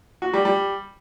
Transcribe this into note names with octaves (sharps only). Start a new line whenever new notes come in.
F#4
G3
G3